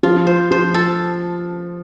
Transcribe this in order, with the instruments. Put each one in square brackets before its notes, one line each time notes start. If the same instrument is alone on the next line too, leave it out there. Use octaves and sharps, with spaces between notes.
[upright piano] F3 [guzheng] F4
[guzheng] C5
[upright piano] F3 [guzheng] C5
[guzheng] A4